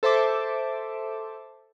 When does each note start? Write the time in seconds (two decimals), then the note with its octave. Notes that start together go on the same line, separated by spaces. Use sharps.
0.03 A4 C5 E5 A5 D6